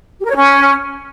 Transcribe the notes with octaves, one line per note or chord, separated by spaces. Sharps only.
G4
A#4
C#5
C#4